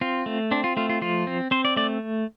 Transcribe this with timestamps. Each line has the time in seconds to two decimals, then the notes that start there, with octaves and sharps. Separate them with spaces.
0.01 C4 F4
0.26 A3
0.51 C4 D4
0.64 F4
0.77 A3 F4
0.89 F4
1.02 F3 F4
1.27 C4
1.51 C4 C5
1.65 D5
1.76 A3 D5